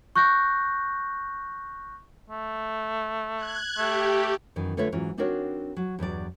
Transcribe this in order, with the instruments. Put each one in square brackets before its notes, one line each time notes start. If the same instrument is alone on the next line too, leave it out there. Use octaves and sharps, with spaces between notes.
[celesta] C#6 F#6 G6 A#6
[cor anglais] A3
[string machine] F#6 G#6
[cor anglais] A3 [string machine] G4
[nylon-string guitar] F#2 D#3 E3
D3 A3 F4 B4 C#5 E5
G#2 E3 F#3 C#4 F4
C4 D4 D#4 F#4 A#4 C#5
F#3
E2 G2 F#3 D5